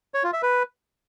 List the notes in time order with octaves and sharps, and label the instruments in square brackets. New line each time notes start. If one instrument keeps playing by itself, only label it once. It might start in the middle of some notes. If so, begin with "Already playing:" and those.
[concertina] C#5
F4
E5
B4